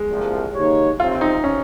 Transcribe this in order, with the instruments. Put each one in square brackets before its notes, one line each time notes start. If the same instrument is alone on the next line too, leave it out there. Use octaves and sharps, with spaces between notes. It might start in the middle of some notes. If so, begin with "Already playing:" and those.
Already playing: [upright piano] G#3
[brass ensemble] C2 A#2 F3
D#3 A#3 D#4 G4 C#5
[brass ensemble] F2 C3 G3 C4 [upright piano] F4
[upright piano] D#4
C#4